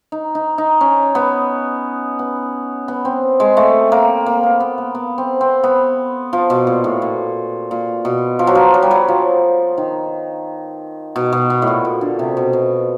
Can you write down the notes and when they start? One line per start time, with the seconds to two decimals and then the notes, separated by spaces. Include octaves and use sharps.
0.12 D#4
0.35 D#4
0.58 D#4
0.81 C#4
1.15 B3
2.19 B3
2.88 B3
3.05 C4
3.40 G#3
3.57 A3
3.92 A#3
4.26 A#3
4.43 B3
4.60 B3
4.78 A#3
4.95 B3
5.18 C4
5.41 C4
5.64 B3
6.33 F3
6.50 B2
6.67 A#2
6.84 A2
7.02 A#2
7.71 A#2
8.05 B2
8.39 F3
8.47 F#3
8.55 F3
8.74 F#3
8.82 G3
8.91 F#3
9.09 F3
9.78 D#3
11.16 B2
11.32 B2
11.50 B2
11.62 A2
11.67 A#2
11.85 A#2
12.01 D3
12.19 C3
12.37 B2
12.53 B2